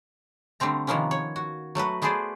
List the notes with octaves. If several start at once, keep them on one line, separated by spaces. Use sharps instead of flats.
D3 G3 A3 C4 A#5
C3 D#3 F3 A#3 B3 C#4
C#5
F#4
F#3 A3 F#4 B4
A3 B3 G#4 B4 C5 D5